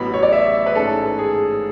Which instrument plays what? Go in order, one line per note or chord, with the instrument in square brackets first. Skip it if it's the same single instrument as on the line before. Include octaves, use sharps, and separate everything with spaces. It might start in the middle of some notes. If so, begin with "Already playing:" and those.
Already playing: [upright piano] A1 A2 F#3 B3 B5
C#5
D5
E5
B4
A1 G#2 G#3 C#4 A4
G#4